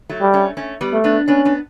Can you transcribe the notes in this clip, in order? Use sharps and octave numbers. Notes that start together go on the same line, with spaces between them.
F#3 A3
G3
A3 C#4
A3 C#4
G3 B3
A3
B3 D4
B3 C#4 D4
B3 D4